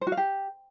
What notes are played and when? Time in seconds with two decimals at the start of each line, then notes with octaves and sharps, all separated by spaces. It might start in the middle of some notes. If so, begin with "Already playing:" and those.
0.01 C5
0.07 F#4
0.12 F5
0.17 G4